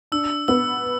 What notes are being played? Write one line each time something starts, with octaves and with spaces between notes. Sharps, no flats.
D4 E6
B3 E6